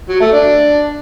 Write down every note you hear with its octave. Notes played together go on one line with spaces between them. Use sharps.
F#3
A3
D4